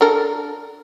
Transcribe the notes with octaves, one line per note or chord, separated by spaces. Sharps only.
D4 A4 A#4